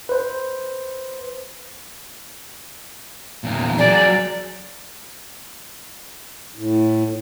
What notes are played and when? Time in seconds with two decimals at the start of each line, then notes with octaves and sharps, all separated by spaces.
0.09 B4 C5
3.44 E2 A#2
3.78 F#3 G#4 D5
6.55 A2